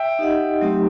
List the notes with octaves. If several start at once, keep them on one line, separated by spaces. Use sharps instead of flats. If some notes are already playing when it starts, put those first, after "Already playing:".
Already playing: E5 G5
D#4 G4 D#5 F#5
F#3 A3 C4 D#4 G4